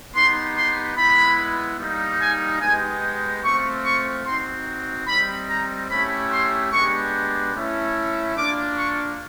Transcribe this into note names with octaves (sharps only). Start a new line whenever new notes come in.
B3 D#4 G4 C6
C6
G#3 B3 E4 B5
G3 A#3 D#4
G#5
G#3 B3 D#4 G4 G#5
A3 C4 F4 C#6
C#6
C4 D#4 F#4 C6
G3 C4 D#4 B5
A#5
A3 C#4 E4 G4 B5
C6
G#3 B3 D4 G4 C#6
A3 C#4 E4
A#3 D4 F4 D6
C#6